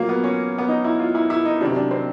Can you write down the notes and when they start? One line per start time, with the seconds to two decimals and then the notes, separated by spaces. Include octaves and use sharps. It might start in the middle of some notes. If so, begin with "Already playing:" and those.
Already playing: A#2 F#3 A#3
0.09 B3
0.24 C#4
0.58 B3
0.69 D#4
0.84 E4
1.00 F4
1.15 E4
1.30 E4
1.45 D#4
1.61 C3 D#3 F#3 D4
1.76 D4
1.91 C4